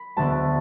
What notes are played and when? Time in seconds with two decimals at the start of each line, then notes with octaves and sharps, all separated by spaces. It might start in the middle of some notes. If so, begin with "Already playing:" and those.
Already playing: B5
0.17 E1 D2 D3 B3 A5